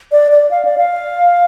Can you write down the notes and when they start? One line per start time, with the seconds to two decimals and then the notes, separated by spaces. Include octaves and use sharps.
0.12 D5
0.32 D5
0.51 F5
0.65 D5
0.78 F5